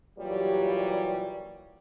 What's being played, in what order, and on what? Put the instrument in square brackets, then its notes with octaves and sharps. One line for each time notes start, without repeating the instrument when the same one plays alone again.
[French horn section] A#2 E3 F#3 G3 G4 C#5